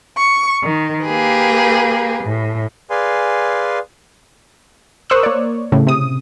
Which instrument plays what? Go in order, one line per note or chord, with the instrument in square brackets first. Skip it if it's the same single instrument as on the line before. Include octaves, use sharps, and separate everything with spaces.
[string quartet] C#6
D#3
A#3 G4 G#4 B4
A2
[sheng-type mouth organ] G#4 B4 D5 F5 G#5 C6
[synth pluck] A#4 C5 C#6 D#6 E6 F#6
A#3 C#5 D5
A2 C#3
C3 D#6